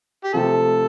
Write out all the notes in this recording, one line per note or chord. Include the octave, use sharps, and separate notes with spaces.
G4
C3 F3 A3 A4